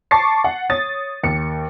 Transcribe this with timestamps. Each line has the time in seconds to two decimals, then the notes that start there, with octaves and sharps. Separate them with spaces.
0.11 A5 C#6 D6 A6 C7
0.44 F#5
0.70 C#5 D#6 A6
1.24 D#2 C#7